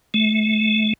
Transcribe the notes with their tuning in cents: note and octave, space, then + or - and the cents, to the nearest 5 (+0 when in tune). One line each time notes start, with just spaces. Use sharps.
A3 -30